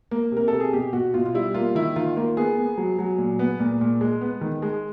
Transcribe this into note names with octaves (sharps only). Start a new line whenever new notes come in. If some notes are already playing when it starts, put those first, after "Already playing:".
A#3
C3
A#4
C3 A4
G#4
B2 G4
B2 F#4
B2 F4
F4
G3 E4
A#3 F4
D#3 E4
D#3 F4
A#3 F4
B3 G#4
B3
F#3
F#3
A#2
B3
A#2
A#2
G#3
B3
D#3
G#3